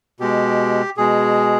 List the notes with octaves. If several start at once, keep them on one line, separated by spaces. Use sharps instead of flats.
B2 G#3 G4
B2 G#3 G#4